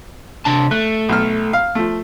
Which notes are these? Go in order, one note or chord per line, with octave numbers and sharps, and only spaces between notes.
C3 D4 A5
A3 F#6
B1 F6
F5
F3 A3